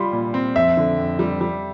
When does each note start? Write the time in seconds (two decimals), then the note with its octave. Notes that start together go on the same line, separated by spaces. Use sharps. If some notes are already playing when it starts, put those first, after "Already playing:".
Already playing: G3 F4 B5 C6
0.12 A#2
0.34 C4
0.56 F2 E5
0.77 D3
0.97 F2
1.19 G3
1.41 G3